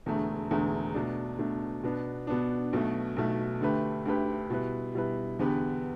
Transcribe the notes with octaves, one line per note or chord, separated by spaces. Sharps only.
E1 E2 D3 A3
E1 E2 D3 A3
B2 A3 D4
B2 A3 D4
B2 B3 D4
B2 B3 D4
B1 B2 A3
B1 B2 A3
D2 D3 A3 G4 B4
D2 D3 A3 G4 B4
B2 G3 E4 B4
B2 G3 E4 B4
E2 D3 B3 G4 B4